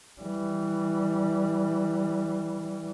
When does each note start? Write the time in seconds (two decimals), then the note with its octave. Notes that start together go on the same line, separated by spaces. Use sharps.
0.22 E3 G3